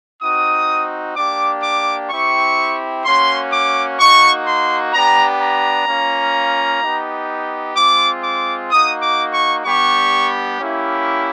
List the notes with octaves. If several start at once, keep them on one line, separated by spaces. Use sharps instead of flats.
C4 D#4 F#4 D#6
A#3 D4 G4 D6
D6
C4 E4 G4 C#6
A#3 C#4 F#4 C6
D6
A#3 D#4 F#4 C#6
C6
B3 D4 G4 A#5
A#5
A#3 C#4 F4
B3 D#4 G4
G#3 C4 F4 D6
D6
A#3 D#4 F#4 D#6
D6
C#6
G3 B3 D4 G4 C#6
A#3 C#4 E4 G4